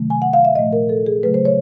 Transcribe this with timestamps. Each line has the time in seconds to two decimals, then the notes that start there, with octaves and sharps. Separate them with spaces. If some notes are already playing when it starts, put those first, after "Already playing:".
Already playing: C3 D#3 F#3 A3
0.10 G#5
0.22 F#5
0.33 F5
0.45 E5
0.56 A#2 F3 A3 D#5
0.73 A#4
0.89 A4
1.06 G#4
1.23 C#3 F#3 A3 B4
1.34 C5
1.45 C#5